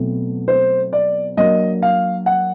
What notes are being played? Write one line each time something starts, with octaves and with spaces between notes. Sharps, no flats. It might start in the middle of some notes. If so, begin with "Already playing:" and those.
Already playing: B2 F#3 A3 C4 E4
C5
D5
F#3 A#3 D4 D#5
F5
F#5